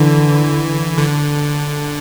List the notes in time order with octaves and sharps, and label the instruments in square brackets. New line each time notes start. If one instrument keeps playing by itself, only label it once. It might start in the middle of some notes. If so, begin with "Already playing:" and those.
Already playing: [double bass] D3 [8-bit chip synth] E3
[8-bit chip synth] D3